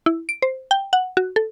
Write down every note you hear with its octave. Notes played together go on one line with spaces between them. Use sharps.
E4
D7
C5
G5
F#5
F#4
A4